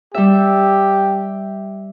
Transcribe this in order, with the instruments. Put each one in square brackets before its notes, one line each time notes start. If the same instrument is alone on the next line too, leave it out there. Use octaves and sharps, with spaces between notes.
[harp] G3 E5 [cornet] G4